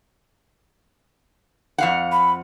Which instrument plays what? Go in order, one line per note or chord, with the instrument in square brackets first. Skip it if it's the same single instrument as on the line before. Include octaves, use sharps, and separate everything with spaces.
[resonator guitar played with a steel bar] F2 F5 F#5
[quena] B5